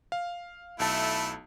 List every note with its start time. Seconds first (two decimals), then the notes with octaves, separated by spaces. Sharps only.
0.12 F5
0.80 B1 A3 E4 A5